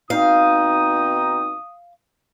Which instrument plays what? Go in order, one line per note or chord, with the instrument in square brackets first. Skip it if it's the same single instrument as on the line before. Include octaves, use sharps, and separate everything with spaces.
[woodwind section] B2 C4 D#4 [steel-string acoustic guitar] F5 [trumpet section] D#6